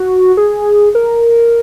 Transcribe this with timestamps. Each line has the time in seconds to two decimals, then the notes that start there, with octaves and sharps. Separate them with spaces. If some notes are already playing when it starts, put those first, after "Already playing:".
Already playing: F#4
0.37 G#4
0.95 A#4